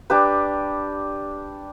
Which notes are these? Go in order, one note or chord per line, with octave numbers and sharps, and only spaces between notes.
D4 G4 B4